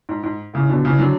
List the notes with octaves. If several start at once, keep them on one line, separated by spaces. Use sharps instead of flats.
G#2
G#2
A2 C#3
B2 D3
C#3 E3
D3 F#3